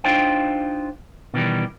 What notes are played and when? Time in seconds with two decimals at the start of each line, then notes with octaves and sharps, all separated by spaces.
0.04 D4 D#4 F4 C5 G5
1.34 B2 D#3 E3 G3